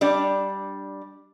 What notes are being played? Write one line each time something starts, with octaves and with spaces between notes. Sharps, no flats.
G3 D4 D5